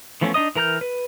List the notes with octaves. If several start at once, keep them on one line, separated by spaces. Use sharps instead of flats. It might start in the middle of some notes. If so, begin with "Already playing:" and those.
E3 F3 A3 B3 C#4
D4 D#4 D#5 D#6
E3 A#4 A#5 F6 G6
B4